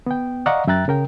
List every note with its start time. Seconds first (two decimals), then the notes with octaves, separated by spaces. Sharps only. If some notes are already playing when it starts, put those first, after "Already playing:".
0.06 B3 G5
0.46 D5 D#5 F5 F#5 A#5 C#6
0.67 F#2 E5 G5 A#5 F#6 A6
0.88 C#3 A#4 G5